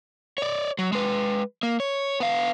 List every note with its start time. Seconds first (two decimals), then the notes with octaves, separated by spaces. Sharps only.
0.38 C#5 D5
0.79 F#3
0.92 G#3 B4
1.63 A#3
1.80 C#5
2.20 B3 F5